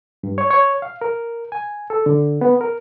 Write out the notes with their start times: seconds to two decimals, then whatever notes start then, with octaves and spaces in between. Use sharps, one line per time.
0.23 G2
0.38 C#5
0.50 C#5
0.82 F5
1.01 A#4
1.52 G#5
1.90 A4
2.06 D3
2.41 B3
2.61 A#4